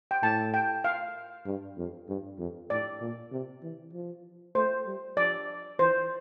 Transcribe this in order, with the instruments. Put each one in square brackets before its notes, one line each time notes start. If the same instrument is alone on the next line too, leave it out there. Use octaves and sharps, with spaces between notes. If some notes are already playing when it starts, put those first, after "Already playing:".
[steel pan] G5
[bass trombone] A2 [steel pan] A5
[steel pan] G5
F5
[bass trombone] G2
F2
G2
F2
[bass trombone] A2 [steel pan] D5
[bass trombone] A#2
C3
E3
F3
[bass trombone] A3 [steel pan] C5
[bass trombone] G3
[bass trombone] F3 [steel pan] D5
[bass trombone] E3 [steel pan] C5